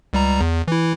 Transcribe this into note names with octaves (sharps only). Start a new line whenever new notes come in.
C#2 G3 A#5
E2
E3 E4